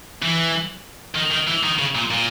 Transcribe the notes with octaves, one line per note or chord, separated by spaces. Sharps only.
E3
D#3
D#3
E3
D#3
C#3
A#2
A#2